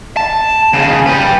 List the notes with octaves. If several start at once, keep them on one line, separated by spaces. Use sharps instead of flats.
A5
D#2 C#3
G4 B4